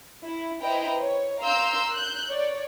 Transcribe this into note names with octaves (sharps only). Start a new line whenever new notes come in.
E4
E4 B4 C5 D#5 G5 A#5
C#5
A#4 F5 A#5 C6 E6 G6
F#6 G6
C#5 D5